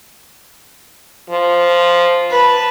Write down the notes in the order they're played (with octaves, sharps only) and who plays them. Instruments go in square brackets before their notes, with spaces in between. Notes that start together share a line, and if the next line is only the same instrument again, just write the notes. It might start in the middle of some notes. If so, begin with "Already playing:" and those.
[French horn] F3
[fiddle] B4 A5